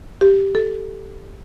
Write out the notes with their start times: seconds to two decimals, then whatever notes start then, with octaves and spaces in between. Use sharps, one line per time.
0.21 G4
0.55 A4